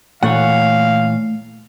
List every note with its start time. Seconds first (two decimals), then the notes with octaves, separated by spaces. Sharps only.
0.23 A#2 E3 A3 C#5 F5 F#5